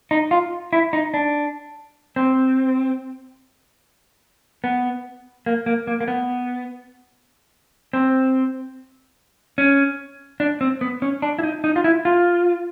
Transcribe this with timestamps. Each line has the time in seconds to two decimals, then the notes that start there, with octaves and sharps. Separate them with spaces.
0.11 D#4
0.31 F4
0.73 E4
0.93 D#4
1.14 D4
2.16 C4
4.64 B3
5.46 A#3
5.66 A#3
5.87 A#3
6.01 A#3
6.08 B3
7.93 C4
9.58 C#4
10.40 D4
10.61 C4
10.81 B3
11.02 C#4
11.22 D4
11.39 E4
11.43 D#4
11.64 D#4
11.76 F4
11.84 E4
12.05 F4